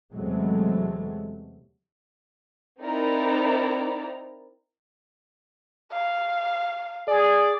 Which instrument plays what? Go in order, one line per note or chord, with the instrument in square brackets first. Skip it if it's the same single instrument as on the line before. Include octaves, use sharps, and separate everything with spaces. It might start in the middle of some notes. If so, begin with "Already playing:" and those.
[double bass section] E2 C3 F#3 G#3 A3
[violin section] C4 D#4 E4 A#4 D5 A#5
[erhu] F5
[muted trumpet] G#4 [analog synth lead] D5